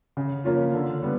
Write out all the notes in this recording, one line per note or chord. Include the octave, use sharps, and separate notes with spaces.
C#3
F3 A#3 C#4 F4
D3
G3 B3